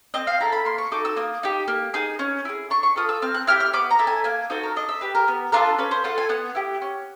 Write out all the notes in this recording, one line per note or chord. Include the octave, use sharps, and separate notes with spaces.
C4 D#5
F5
E4 A4 A#5
B5
A#3 C6
C#6
D#4 F#4 A4 D6
E6
A#3 D#6
D#4 G4
A#3
D#4 G#4
C#4
E4 G#4
D4 C#6
C#6
F4 A4 D#6
E6
C4 F6
F#6
E4 G4 F6
F6
B3 D6
A#5
E4 A4
G#5
A#3 G#5
D#4 F#4 A4 C5
A#4
D4 D#5
E5
G4 B4
A#4
B3
D4 F4 A4 A#4
C#4 B4
C5
F4 A4 F#5
G#5
B3 F#5
E4 G4
C#4